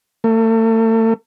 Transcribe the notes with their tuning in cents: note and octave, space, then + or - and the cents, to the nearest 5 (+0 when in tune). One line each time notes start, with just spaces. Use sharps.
A3 +35